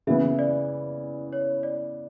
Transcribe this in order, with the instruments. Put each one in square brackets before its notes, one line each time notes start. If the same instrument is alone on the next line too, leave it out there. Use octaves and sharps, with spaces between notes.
[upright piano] C#3 E3 B3 E4 [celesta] E5
[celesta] D5
C#5
D5